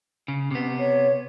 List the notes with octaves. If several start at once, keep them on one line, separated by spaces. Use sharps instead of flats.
C#3
C3 B3
C#5